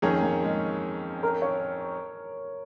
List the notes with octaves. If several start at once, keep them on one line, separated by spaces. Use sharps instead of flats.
F2 D#3 A#3 C#4 G#4
A#3
G#3
A#4
C#5